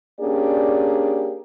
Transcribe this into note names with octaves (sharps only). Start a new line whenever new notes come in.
A#3 C#4 D4 G4 G#4 D5